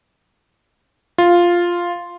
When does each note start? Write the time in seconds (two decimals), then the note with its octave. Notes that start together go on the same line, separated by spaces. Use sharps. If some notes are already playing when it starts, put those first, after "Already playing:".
1.18 F4